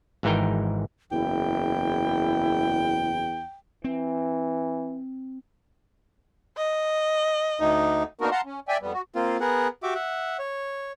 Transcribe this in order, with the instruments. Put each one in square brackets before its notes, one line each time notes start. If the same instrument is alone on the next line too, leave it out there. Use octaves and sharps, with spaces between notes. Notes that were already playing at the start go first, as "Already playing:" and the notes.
[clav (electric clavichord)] G#1 G#2 E3 D#4 A#4 G5
[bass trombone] F#1 [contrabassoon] E2 [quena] E4 [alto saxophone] G5
[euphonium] E3 [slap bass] C4
[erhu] D#5
[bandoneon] D2 D#4
[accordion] A#3 B3 D4 D#4 F#4 A#4
F5 F#5 A5 A#5 C6
C#4
D5 E5 G5 G#5
F2 G3 B3
F#4
[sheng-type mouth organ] A#3 C4 F4
B3 G#4 A#4 F#5
F#4 G4 E5 D6
E5 F#5
C#5